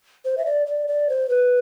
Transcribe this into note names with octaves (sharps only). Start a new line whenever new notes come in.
C5
E5
D5
D5
D5
C5
B4